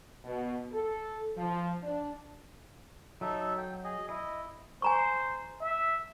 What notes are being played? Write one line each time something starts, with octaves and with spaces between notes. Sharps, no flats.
B2
A4
F3
D4
F#3 D#4 A4 E5
G5
G#4 D#5
E4 D#5
C5 G#5 A#5 C#6
E5